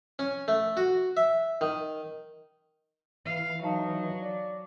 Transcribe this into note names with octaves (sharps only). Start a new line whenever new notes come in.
C#4
A3
F#4
E5
D#3
E3 F5
F#3 D#4 F5 A5
D5